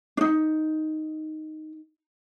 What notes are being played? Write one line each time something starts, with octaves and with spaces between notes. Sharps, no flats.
D4 D#4